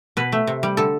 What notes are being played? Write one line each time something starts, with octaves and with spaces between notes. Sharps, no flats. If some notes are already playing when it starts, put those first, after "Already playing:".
B2 B4
A3
C3
G3
D3 A4